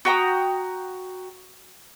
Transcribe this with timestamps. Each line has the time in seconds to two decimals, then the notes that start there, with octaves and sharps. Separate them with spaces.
0.05 F#4 G5 A#5 D#6